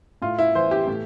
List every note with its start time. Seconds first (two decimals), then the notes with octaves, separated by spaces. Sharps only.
0.22 A2 F4
0.38 E4
0.55 E3 C5
0.71 G4
0.87 A2